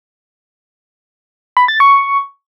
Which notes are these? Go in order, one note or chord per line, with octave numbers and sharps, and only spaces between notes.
B5
A6
C#6